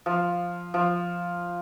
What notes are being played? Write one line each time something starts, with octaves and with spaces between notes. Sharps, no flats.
F3
F3